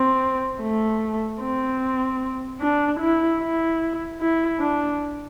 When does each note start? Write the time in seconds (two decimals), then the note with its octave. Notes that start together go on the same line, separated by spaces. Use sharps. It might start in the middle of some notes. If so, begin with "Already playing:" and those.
Already playing: C4
0.62 A3
1.41 C4
2.61 D4
3.00 E4
3.40 E4
4.20 E4
4.59 D4